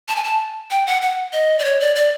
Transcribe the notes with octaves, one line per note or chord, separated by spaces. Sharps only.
A5
G#5
A5
G5
F#5
F#5
D#5
D5
C#5
D5
D5